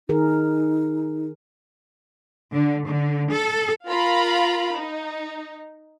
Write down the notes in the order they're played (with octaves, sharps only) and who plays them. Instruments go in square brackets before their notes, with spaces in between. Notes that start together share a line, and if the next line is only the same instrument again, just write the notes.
[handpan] D#3 G#4 A#4 [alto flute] D#4
[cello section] D3
D3
A4
[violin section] F4 A#4 F5 A#5 B5
D#4